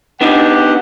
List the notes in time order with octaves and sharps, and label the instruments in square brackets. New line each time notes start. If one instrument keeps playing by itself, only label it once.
[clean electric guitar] B3 D4 D#4 [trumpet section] G4 F#5